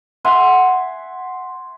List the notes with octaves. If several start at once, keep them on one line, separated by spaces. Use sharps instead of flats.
E5 F#5 G#5 C6